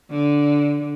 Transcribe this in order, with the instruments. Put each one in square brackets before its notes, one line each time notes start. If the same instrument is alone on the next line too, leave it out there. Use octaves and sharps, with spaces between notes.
[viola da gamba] D3